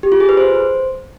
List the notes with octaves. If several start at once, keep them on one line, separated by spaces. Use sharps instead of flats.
G4
F4
G#4
B4
C5